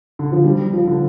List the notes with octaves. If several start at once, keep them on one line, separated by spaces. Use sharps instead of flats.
D3
F3
G3
F3
D3